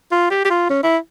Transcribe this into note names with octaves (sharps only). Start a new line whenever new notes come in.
F4
G4
G4
F4
C#4
E4